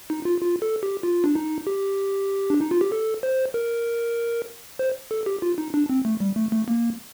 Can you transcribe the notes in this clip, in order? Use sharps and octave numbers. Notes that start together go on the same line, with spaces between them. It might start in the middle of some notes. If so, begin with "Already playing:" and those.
D#4
F4
F4
A4
G4
F4
D4
D#4
G4
D4
D#4
F4
G4
A4
C5
A#4
C5
A4
G4
F4
D#4
D4
C4
A3
G3
A3
A3
A#3